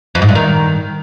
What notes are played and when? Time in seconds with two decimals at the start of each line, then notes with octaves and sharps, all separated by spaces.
0.15 F2
0.22 G#2
0.29 G2
0.35 D#3